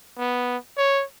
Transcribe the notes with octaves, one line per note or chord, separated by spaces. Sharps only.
B3
C#5